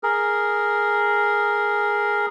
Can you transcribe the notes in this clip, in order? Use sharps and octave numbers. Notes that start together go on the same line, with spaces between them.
G#4 A#4